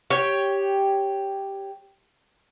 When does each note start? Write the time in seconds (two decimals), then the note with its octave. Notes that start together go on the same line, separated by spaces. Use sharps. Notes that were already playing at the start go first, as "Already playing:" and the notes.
0.10 G4 C#5